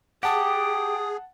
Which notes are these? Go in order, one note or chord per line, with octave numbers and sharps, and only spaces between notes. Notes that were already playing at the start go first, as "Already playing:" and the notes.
G4 G#4 F#5 A5 D#6